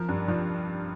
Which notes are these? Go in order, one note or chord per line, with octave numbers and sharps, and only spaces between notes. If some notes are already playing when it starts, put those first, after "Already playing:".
Already playing: F3 A#4
G2
F3